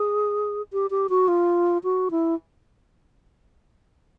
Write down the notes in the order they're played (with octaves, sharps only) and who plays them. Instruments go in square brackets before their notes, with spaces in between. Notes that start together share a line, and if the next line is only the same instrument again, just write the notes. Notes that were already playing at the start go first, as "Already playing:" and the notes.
Already playing: [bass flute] G#4
G4
G4
F#4
F4
F#4
E4